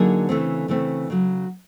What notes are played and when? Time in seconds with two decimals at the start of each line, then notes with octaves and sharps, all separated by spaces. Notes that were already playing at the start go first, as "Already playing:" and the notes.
Already playing: D3 F#3 A#3 D#4 G#4
0.29 C#3 E3 A3 C4
0.68 C#3 E3 A3 C4
1.10 C#3 F#3